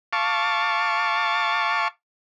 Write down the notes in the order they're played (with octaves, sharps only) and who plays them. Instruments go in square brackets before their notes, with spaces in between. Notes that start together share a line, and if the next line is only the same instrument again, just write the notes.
[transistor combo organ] F5 A5 C#6 D6